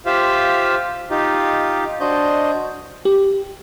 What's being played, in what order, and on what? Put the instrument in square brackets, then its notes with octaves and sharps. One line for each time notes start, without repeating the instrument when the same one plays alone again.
[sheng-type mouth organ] F4 G4 C5 E5 F5
D#4 F4 G4
D4 F#4 C5 D#5 G6
[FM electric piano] G4